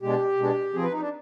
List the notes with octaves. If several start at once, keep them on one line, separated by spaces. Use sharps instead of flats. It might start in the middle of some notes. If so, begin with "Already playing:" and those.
B2 G#3 D4 G4
B2 G#3 D4
F3 C4 G#4
B4
D#4
D4